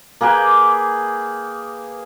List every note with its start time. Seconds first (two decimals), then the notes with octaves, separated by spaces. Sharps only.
0.21 A#3 G#4 B4 G5